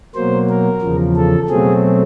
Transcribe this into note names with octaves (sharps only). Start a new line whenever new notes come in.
B2 F#3 A#3 C5
A#4
E2 C#3 F3
A4
B2 F#3 A3 C4 G#4